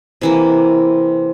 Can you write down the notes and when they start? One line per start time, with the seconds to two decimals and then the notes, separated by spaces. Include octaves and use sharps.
0.21 C3 E3 A#3